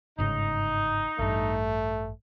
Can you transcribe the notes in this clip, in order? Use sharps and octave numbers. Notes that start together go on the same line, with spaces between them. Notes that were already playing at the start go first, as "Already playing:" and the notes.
G1 G#2 C#3 D#4
A1 G2 A3